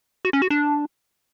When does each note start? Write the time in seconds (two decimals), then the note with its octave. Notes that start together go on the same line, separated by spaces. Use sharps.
0.25 F#4
0.33 C#4
0.42 F#4
0.50 D4